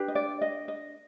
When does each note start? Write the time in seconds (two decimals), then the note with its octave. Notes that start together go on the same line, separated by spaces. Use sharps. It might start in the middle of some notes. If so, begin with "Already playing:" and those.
Already playing: D4 G4 B4
0.08 D#5
0.15 D5
0.42 D#5
0.68 D#5